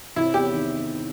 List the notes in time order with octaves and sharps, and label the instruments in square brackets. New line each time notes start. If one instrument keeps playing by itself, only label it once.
[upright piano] C3 [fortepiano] E4
[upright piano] E2 [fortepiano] G4
[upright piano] D#3